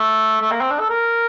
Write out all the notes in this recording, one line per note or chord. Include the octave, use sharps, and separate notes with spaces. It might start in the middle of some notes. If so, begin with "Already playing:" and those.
Already playing: A3
A3
A#3
C4
D4
A4
A#4